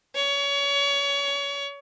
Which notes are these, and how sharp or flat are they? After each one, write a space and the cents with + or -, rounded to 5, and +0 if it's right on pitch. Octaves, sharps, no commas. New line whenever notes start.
C#5 +30